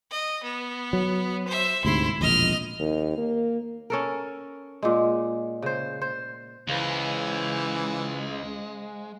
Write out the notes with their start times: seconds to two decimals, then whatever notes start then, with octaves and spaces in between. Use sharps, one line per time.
0.11 D#5
0.44 B3
0.93 F#3
1.48 C5 E5
1.85 D2 G#2 C3 E4 C6
2.21 E1 A#1 F2 D#5 F6
2.79 D#2
3.17 A#3
3.90 C#4 A4 A#4
4.82 A#2 G#3
5.62 C#3 C5
6.02 C5
6.69 C#2 E3 G#3 C5 F5